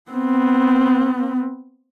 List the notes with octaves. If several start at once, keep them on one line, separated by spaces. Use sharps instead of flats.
B3 C4